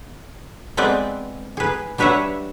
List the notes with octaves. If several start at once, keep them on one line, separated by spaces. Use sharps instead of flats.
G#3 B3 C4 B4 D5
G#4 B4
G3 D4 B4 C#5 E5 F#5